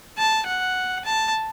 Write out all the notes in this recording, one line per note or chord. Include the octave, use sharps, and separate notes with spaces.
A5
F#5
A5